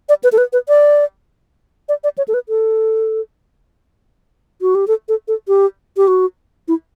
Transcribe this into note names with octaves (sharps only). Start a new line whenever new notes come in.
D5
B4
A4
B4
B4
D5
D5
D5
C#5
A4
B4
A4
F#4
G4
A4
A4
A4
G4
G4
F#4
E4